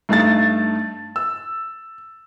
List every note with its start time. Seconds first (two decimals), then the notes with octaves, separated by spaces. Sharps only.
0.09 G2 A3 D#4 A5 A6
1.16 E6